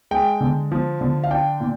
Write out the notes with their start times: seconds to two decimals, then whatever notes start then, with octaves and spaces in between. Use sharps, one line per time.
0.11 G#3 G5
0.41 D3
0.72 F3
1.01 D3
1.24 F5
1.31 D4 G5
1.60 A#2